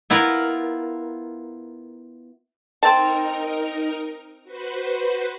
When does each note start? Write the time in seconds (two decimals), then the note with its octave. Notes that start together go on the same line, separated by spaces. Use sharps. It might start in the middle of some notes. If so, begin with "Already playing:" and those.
0.10 B3 E4 F4 A#4
2.83 C4 D#4 A#4 A5
4.43 F#4 B4 C5